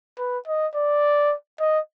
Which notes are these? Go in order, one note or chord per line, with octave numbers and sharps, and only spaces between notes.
B4
D#5
D5
D#5